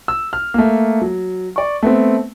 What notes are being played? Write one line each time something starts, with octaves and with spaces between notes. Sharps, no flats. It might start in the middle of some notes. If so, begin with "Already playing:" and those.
E6
F6
A3 A#3
F#3
D5 C#6
A3 B3 C4